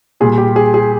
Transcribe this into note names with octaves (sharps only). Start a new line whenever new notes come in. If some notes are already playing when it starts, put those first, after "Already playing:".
A#2 G3 G#4
G4
G#4
G#4